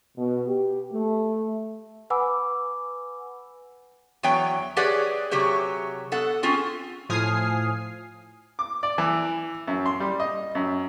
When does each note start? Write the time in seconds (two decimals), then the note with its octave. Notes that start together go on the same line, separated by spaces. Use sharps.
0.17 B2
0.47 G4
0.92 A3
2.10 B4 F#5 G#5 B5 D6 E6
4.23 E2 F#3 B3 C#5 G5
4.77 G4 G#4 B4 C#5 D5 F#5
5.31 C3 F#3 G4 G#4 C#5
6.12 B3 A4 F#5
6.43 C4 C#4 F4 G#4
7.09 A2 F3 G#5 D#6 F6 C7
8.59 D6
8.83 D5
8.98 E3
9.68 F#2
9.86 C6
10.00 G3
10.20 D#5
10.55 F#2